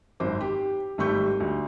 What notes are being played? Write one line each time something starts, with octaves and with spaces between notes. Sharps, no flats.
G#1 F#2 C5 D6
G4
G#1 G3 A3 C#6 G6
D2